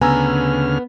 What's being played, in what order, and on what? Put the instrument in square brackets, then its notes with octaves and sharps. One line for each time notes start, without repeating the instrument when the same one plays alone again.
[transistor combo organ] D2 C#3 F6 [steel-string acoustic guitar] B3 [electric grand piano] G#5 A#5 E6